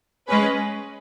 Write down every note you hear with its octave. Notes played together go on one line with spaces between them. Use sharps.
G#3 C#4 G#4 B4